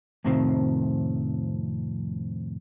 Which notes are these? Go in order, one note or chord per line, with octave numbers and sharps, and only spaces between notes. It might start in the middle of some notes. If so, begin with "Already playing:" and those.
F2 A2 C3 D#3 F3 C4